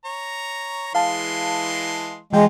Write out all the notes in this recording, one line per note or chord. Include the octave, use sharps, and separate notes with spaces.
C#5 A#5
E3 G#3 F5 A5 C6
E3 F#3 G#3 F4 G5